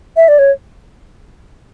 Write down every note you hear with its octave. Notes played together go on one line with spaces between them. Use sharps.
E5
D5
C#5